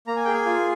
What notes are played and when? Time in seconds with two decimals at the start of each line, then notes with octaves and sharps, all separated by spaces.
0.07 A#3 A#5
0.16 G#5
0.25 G#4 G5
0.34 G#5
0.46 F4